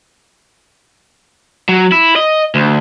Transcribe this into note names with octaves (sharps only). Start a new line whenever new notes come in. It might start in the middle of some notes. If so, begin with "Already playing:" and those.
F#3
E4
D#5
D2